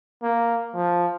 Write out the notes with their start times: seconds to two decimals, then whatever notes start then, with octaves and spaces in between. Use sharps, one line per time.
0.23 A#3
0.75 F3